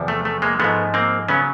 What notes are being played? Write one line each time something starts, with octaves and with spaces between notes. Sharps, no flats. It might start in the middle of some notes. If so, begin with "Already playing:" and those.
Already playing: E2 C3 F3
A3
A3
G#3 A#3
G#2 F3 G#3 A3 B3
A#3 C4
C#3 F#3 B3 C#4